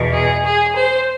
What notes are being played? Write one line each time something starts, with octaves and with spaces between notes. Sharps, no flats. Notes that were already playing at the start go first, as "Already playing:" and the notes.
Already playing: E2 B2
G#4
G#4
C5